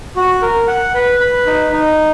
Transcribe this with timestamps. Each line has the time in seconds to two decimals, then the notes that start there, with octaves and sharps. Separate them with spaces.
0.16 F#4
0.42 A#4
0.67 F#5
0.94 B4
1.20 B4
1.46 D#4
1.72 D#4